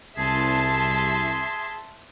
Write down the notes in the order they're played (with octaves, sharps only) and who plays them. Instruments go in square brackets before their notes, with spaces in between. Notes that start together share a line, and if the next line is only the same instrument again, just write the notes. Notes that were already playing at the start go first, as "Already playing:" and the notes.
[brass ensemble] C2 [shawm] G#4 [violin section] E5 A5 C6